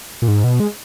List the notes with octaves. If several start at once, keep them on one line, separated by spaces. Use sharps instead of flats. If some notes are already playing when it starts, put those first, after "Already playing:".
A#2
G#2
B2
G#3